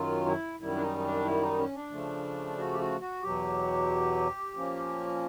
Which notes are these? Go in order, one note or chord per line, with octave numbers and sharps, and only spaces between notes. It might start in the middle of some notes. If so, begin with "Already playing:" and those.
Already playing: F#2 D#3 F#3 F4
E4
F#2 D#3 G3 E4
D4
D#4
D#4
D4
E4
D#4
C#4
D4
C#3 F3 A3
F#4
G4
F#4
F#4
E2 B2 F#3 G4
A#2 F3 A#3 C#4